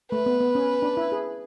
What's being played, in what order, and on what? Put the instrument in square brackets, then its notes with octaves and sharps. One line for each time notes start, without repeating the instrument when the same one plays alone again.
[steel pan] A3 [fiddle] B4
[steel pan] B3
B3
C#4
D4
E4
G#4